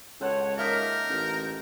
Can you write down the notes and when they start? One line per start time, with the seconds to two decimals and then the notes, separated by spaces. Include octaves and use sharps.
0.21 C#2 A4 C5 C#5 F#5
0.58 A#3 D#4 A#4 E5 D#6
1.10 A1 G6